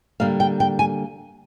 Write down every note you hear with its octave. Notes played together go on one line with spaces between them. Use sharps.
D3 G3 A#3 F5
G5
G5
G#5